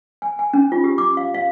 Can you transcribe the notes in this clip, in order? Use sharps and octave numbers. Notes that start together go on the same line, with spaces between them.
G#5
G#5
C#4
F4
G4
D6
F5
F5